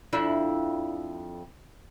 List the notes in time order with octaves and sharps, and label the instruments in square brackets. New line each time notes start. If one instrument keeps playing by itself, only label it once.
[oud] F2 D4 E4